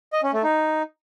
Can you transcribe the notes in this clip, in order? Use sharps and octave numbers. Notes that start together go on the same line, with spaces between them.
D#5
C#4
A3
D#4